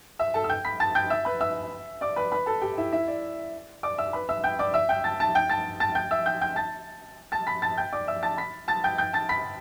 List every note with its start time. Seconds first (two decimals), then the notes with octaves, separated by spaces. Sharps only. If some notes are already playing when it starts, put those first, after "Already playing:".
0.19 E5 E6
0.34 A4 A5
0.44 E6
0.49 G5 G6
0.65 B5 B6
0.80 A5 A6
0.95 G5 G6
1.10 E5 E6
1.25 B4 B5
1.40 E5 E6
2.01 D5 D6
2.16 B4 B5
2.32 B4 B5
2.46 A4 A5
2.61 G4 G5
2.78 E4 E5
2.93 E4 E5
3.08 D5
3.83 D5 D6
3.98 E5 E6
4.13 B4 B5
4.29 E5 E6
4.44 G5 G6
4.59 D5 D6
4.74 E5 E6
4.89 G5 G6
5.04 A5 A6
5.20 A5 A6
5.35 G5 G6
5.49 A5 A6
5.80 A5 A6
5.95 G5 G6
6.11 E5 E6
6.26 G5 G6
6.41 G5 G6
6.56 A5 A6
7.32 A5 A6
7.47 B5 B6
7.62 A5 A6
7.78 G5 G6
7.93 D5 D6
8.08 E5 E6
8.23 A5 A6
8.38 B5 B6
8.68 A5 A6
8.84 G5 G6
8.98 G5 G6
9.13 A5 A6
9.29 B5 B6